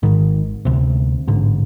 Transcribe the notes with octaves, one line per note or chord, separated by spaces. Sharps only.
G#1 G#2 D#3
D2 C3
A1 G#2 D3